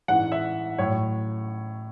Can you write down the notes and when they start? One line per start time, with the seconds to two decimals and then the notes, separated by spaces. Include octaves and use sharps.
0.08 A1 G#2 E3 F#5
0.32 E5
0.78 A2 F#3 C#5